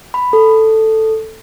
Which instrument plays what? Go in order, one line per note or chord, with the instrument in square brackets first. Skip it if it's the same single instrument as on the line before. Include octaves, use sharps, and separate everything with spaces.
[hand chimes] B5
A4